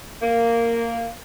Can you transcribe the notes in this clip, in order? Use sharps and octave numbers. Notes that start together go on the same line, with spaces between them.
A#3